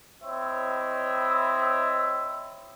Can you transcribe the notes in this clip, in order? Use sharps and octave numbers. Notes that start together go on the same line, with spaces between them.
C4 E4 C#5 D#5 E5